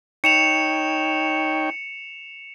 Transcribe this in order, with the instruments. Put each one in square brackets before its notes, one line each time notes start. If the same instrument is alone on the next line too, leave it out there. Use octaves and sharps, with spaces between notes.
[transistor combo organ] D#4 C#5 G5 [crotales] C#7 E7 F7